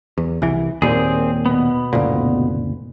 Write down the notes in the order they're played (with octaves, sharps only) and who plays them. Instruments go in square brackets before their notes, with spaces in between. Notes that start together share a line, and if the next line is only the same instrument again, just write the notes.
[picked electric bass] E2
C2 E3
[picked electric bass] D#2 A#2 [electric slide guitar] C4 G#4
[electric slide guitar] B2 B3
[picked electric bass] F#1 D2 A#2